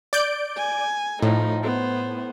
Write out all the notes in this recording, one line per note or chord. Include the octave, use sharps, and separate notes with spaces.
D5 G6 D7
G#5
A2 F3 D#4
B3 C5